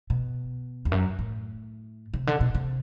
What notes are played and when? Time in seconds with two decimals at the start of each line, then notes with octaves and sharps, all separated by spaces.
0.10 B2
0.85 E2
0.92 F#2
1.19 A2
2.14 C3
2.27 D3
2.40 B2
2.55 C3